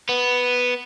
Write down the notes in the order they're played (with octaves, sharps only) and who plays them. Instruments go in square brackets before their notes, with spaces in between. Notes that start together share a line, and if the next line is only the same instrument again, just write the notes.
[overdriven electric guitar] B3